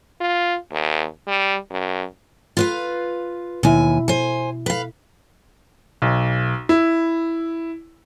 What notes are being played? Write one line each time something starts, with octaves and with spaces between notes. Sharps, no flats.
F4
D#2
G3
F#2
F4 B4 F5
D#2 B2 E4 E5 G#5
C5 G#5
B4 F5
B1
E4